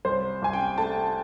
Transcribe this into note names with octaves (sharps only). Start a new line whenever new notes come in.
C2 C5
C2 G#5
G5
A3 A5